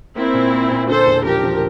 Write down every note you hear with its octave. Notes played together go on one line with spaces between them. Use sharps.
A#3 C4 E4
A#2
A#3
A#2
D3 A4 C5
E1
F3 G4 A#4
F3